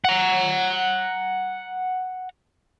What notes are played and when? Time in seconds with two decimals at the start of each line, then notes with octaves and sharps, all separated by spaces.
0.05 F#5 A#5